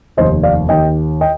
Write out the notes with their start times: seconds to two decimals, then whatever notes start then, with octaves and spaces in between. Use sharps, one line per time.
0.17 F1 D#2 D#3 C5 D#5
0.43 D5 F5
0.69 D#2 D#3 D#5 G5
1.21 D#5 G5